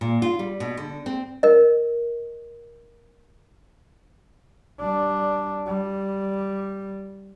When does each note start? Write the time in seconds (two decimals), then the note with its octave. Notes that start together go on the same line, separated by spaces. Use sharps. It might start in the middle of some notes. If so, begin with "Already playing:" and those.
0.01 A#2
0.22 F4
0.39 G3
0.60 B2
0.77 D3
1.06 C4
1.43 A#4 D#5
4.80 G3 D4
5.67 G3